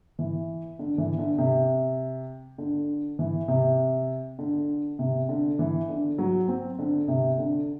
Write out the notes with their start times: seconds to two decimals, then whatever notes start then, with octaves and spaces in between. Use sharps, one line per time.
0.19 E3
0.79 D3
0.98 E3
1.18 D3
1.38 C3
2.58 D3
3.19 E3
3.48 C3
4.39 D3
4.99 C3
5.29 D3
5.59 E3
5.89 D3
6.18 F#3
6.48 C4
6.79 D3
7.08 C3
7.38 D3